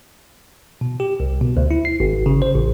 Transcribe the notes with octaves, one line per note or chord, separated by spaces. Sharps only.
B2
G4
C2
B2
D2
E4
C7
G#1
C#3
C5
A1